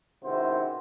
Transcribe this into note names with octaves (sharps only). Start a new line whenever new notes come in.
C#2 C3 D#3 E4 F#4 C5